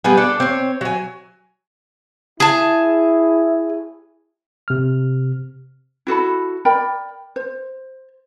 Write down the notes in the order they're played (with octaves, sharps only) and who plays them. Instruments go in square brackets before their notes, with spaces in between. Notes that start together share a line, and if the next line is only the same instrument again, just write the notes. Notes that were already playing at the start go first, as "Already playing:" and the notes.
[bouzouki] G3 B3 G#4
D4 A4 D5
C4 C#5
F#3 G#5
[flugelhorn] E4 [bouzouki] G#4 A5
[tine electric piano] C3 F6
[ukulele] E4 F#4 A4 B5
A#4 D5 G5 B5
C5